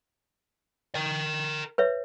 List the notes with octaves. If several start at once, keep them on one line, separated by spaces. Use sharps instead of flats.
A#4 G5
B4 C#5 E5